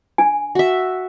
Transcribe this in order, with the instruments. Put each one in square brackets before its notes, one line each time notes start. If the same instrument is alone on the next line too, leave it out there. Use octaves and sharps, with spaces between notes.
[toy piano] D4 G#5
[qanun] F#4 E5